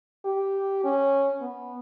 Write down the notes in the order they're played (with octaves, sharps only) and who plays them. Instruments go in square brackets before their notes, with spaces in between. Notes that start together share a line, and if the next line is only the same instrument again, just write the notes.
[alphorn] G4
C#4
B3